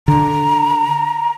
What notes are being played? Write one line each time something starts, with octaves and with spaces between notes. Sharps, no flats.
D3 A#5